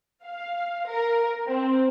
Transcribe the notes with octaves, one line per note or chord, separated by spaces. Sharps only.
F5
A#4
C4